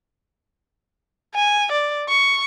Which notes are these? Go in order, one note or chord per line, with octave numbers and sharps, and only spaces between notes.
G#5
D5
C#6